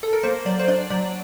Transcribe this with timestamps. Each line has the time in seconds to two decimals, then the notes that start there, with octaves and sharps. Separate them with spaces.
0.03 A4
0.13 A#4
0.23 A#3 C5
0.45 F#3 D5
0.59 C5
0.68 D4 D5
0.90 F#3 D5